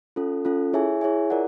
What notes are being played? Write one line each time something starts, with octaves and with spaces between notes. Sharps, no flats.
C#4 F4 A4
C#4 F4 A4
E4 G#4 C#5 E5 G#5
E4 G#4 C#5 E5 G#5
F4 A#4 D5 F#5